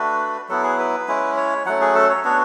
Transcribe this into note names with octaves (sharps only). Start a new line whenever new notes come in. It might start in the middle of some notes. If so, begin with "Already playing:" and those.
Already playing: A3 D4 F#4 B4
F#3 B3 E4 A4
G#4
B4
G#3 C#4 E4
C#5
F#3 A3 C#4 F#5
G#4
A4
C#5
B3 D4 F#4 C#5